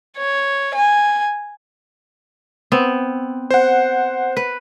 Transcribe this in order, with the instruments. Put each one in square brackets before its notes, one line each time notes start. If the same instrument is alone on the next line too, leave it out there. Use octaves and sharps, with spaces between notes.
[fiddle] C#5
G#5
[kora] B3 C4
[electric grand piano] C5 F#5
[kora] B4